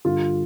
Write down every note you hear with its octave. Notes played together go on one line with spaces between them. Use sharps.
G2 D3 G3 F4